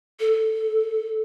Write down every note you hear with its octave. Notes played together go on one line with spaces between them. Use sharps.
A4